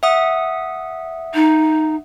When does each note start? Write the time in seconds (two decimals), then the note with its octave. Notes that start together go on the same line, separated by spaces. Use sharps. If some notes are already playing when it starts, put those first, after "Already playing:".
0.03 E5 F#5 D#6
1.34 D#4